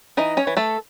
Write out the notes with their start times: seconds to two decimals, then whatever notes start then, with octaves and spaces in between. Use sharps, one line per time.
0.17 E3 D#4 D#5
0.37 C#4 C#5
0.47 E3
0.57 A3 A4